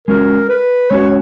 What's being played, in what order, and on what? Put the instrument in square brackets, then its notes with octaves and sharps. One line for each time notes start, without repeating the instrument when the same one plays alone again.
[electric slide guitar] G#3 C#4 F#4 [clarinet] A#4
[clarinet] B4
[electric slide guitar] G#3 C#4 F#4 [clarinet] C#5